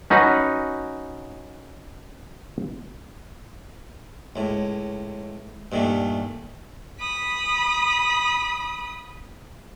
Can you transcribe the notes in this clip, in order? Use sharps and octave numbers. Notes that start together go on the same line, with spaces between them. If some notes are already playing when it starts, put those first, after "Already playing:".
C#4 D#4 F#4 B4
C#2 A2
G2 A#2 D#3 G3 A3
B5 D#6